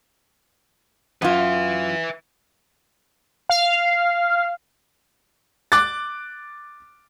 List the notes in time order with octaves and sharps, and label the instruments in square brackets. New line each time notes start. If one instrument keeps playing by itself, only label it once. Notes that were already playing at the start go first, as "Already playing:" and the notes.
[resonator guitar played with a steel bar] F#2 F4 [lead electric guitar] B4 E5
[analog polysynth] F5
[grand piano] D6 F#6 A6